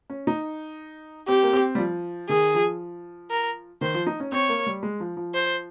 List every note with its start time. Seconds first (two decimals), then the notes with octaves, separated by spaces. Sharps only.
0.10 C#4
0.27 D#4
1.28 C4 G4
1.43 A#3
1.53 C4
1.75 G3
1.78 F3
2.29 D#3 G#4
2.54 F3
3.30 A#4
3.81 D#3 C5
3.94 F3
4.07 D#4
4.20 C#4
4.32 C4 C#5
4.49 A#3
4.66 G3
4.83 G#3
5.00 F3
5.17 F3
5.34 C5